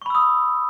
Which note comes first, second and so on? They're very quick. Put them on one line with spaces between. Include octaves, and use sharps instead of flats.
C#6 B5 E6 D#6